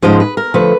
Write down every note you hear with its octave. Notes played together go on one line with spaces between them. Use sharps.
G#2 F3 G#3 C#4 C5
B4
A#4
D3 F3 A3 B4